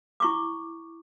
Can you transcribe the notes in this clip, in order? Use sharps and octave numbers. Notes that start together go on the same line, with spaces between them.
E4 C#6 D6